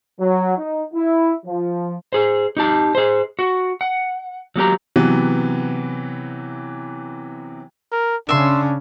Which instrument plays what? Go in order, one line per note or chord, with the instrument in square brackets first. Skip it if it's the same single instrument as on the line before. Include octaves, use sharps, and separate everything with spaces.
[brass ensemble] F#3
D#4
E4
F3
[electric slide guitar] G#4 C5
D#4 G4 A5
G#4 C5
F#4
F#5
F#3 A#3 G4 A#5
[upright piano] C3 E3 F#3 B3
[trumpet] A#4
[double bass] C#3 C#4 [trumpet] D4 [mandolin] E5 C6